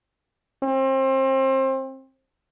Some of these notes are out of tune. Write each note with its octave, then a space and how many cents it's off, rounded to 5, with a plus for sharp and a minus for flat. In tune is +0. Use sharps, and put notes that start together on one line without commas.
C4 +30